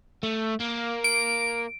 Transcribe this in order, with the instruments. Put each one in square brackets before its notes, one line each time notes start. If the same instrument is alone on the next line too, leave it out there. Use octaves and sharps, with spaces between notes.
[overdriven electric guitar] A3
A#3
[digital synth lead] D7